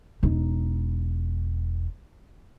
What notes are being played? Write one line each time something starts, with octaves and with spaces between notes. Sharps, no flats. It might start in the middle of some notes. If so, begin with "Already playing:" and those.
E1 D#4